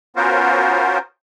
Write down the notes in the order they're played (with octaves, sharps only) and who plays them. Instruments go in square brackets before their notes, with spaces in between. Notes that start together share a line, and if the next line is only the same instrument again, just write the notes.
[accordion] B3 C#4 F4 F#4 A#4 C5